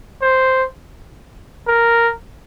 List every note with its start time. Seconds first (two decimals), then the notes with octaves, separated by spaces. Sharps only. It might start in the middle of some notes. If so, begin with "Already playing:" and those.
0.22 C5
1.68 A#4